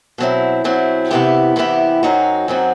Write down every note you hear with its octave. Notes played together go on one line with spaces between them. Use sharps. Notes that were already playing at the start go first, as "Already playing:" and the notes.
B2 F#3 C4 E4
B2 F#3 C4 E4
C3 E3 B3 E4 G4
C3 E3 B3 E4 G4
F#2 F#3 C4 D#4 F#4
F#2 F#3 C4 D#4 F#4